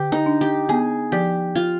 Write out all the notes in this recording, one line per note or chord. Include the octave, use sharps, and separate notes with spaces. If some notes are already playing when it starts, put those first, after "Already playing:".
Already playing: D3 G4
D#4
D4
G4
B3 G#4
F3 G4
F4